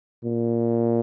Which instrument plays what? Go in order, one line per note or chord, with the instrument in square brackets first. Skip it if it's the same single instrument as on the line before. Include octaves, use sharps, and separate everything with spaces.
[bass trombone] A#2